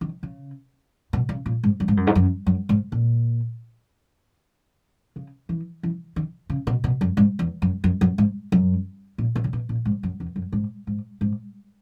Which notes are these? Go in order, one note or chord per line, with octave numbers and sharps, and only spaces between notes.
D#3
C#3
B2
C#3
A#2
G#2
F#2
G#2
F#2
G#2
F#2
F#2
G#2
A#2
C#3
E3
E3
D#3
C#3
B2
B2
F#2
G#2
E2
F#2
F#2
F#2
G#2
F#2
A#2
B2
C#3
B2
A#2
G#2
F#2
E2
F#2
G#2
G#2
G#2